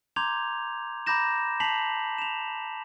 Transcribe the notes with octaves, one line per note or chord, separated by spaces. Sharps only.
A#5 C6 D6 G6 G#6 F7
A#5 B5 D6 G6 A#6 E7
A5 B6 C7 F7 F#7
E7 F7